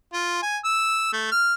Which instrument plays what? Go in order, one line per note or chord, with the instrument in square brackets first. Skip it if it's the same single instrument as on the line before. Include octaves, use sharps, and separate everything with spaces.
[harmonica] F4
G#5
E6
A3
F6